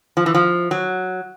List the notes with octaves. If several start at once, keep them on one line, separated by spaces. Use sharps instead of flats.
F3
E3
F3
F#3